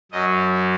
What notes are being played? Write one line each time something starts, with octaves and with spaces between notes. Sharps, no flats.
F#2 F#3 D#5